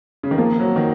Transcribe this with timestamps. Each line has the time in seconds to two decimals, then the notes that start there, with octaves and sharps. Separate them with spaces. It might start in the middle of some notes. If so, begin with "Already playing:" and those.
0.23 C#3
0.31 D#3
0.38 F3 A#3
0.60 F#3
0.76 D#3